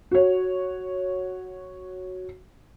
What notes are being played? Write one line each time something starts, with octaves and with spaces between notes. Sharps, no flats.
F#4 C#5